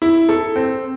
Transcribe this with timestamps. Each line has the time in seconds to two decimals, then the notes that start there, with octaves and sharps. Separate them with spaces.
0.02 E4
0.29 A4
0.56 C4